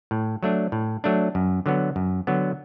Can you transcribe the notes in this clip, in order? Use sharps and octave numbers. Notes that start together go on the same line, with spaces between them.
A2
F#3 A3 D4
A2
F#3 A3 D4
F#2
D3 F#3 B3
F#2
D3 F#3 B3